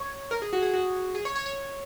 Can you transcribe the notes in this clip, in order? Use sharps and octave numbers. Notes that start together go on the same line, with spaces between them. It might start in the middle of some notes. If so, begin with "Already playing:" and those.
Already playing: C#5
A#4
G#4
F#4
G#4
F#4
G#4
C#5
C#5
C#5